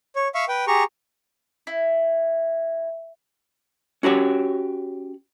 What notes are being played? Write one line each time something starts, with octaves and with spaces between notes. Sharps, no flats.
C#5
E5 F5 C#6
B4 G5
G4 G#4 A#5 C#6
E4
C#4 F#4 G4 C#5